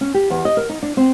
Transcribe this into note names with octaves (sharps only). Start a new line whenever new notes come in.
C#4
G4
E2
D#5
A#4
D#4
D4
C4